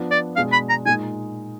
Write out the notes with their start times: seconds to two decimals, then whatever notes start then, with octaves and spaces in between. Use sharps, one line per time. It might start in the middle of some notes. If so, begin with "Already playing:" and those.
Already playing: F3 B3 D4
0.11 D5
0.36 B2 G#3 D4 F5
0.53 B5
0.69 A#5
0.85 A#2 G#3 D#4 G#5